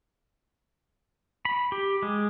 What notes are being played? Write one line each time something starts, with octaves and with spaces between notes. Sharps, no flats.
B5
G4
G#3